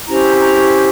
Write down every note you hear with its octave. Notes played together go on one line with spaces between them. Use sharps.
C#4 E4 G4 C5 A#5
A#5